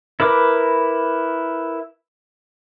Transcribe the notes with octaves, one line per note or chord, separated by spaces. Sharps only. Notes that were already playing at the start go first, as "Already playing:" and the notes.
E4 A#4 B4 D6